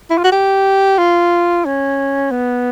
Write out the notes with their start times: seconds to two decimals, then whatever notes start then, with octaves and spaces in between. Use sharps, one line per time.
0.10 E4
0.18 F4
0.24 F#4
0.32 G4
0.98 F4
1.65 C#4
2.31 B3